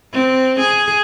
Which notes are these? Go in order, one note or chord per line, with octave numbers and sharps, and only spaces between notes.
C4
G#4